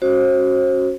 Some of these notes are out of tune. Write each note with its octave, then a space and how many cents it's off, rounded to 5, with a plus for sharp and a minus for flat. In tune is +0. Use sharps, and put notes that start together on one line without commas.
C#4 -10 F#4 +0 C5 +35